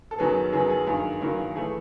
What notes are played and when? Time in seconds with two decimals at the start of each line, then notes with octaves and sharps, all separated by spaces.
0.11 A4
0.18 F#2 D#3 F#3 B3 G#4
0.52 F#2 D#3 F#3 B3 G#4
0.70 G#4
0.87 G2 D#3 F#3 A#3 G#4
1.21 G2 D#3 F#3 A#3
1.55 E3 A3 G#4